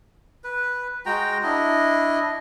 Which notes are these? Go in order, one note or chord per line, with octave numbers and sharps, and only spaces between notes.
B4
G#3 F#4 G5 A#5
D4 E4 D#5